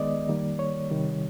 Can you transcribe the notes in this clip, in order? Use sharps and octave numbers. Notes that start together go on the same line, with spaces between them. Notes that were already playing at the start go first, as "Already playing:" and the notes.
Already playing: D#3 G#3 B3 D5 D#5
D#3 G3 A#3
C#5
C3 D#3 G3